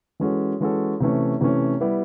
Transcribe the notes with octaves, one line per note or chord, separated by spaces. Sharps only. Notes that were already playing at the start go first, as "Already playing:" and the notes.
E3 G#3 C#4 F#4 A4
E3 G#3 C#4 F#4 A4
C3 E3 A3 C#4
C3 E3 A3 C#4
G3 B3 E4 G4